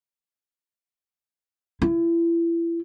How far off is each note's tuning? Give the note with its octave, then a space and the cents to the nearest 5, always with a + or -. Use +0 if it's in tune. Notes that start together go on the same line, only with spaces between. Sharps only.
E4 +30